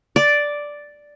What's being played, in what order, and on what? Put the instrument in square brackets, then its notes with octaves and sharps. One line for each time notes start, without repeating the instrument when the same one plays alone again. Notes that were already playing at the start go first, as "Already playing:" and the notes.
[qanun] D5